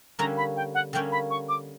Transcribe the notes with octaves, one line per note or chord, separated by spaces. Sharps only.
D3 G3 A#3 C#4 A#5
B5
G5
F#5
D3 G3 A#3 C#4 G5
B5
C#6
D6